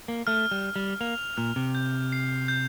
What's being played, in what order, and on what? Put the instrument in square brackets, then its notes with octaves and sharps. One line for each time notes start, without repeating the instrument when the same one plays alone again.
[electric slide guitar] A#3
[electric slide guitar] A3 [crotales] F6
[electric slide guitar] G3
[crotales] F6
[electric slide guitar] G3
[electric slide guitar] A#3 [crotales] F7
[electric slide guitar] A#2 [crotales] F6
[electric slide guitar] C3
[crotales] G6
C7
G6